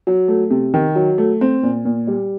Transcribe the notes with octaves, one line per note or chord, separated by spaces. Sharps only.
F#3
A3
C3
D#3
F#3
A3
C4
A#2
A#2
G3